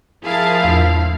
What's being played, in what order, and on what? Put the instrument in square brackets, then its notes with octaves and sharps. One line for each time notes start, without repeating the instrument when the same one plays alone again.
[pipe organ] F3 [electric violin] E4 F5 [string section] G#4 A#4 A5
[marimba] E2 [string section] A2